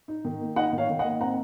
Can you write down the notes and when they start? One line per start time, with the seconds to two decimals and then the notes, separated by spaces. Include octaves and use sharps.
0.08 D#4
0.25 D#3
0.41 A#3
0.56 D#4 D#5 F#5
0.73 D#3
0.78 C#5 F5
0.89 D#3
0.99 D#5 F#5
1.04 A#3
1.21 C4 F#5 A#5